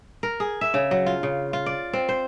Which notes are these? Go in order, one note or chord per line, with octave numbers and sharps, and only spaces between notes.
A#4
G#4
E5
C#3
F#3
F4
C#3
F4
D5
C4
C5